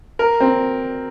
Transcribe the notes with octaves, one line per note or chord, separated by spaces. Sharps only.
A#4
C4